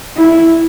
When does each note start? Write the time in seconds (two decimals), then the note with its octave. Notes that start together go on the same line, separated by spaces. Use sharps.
0.17 E4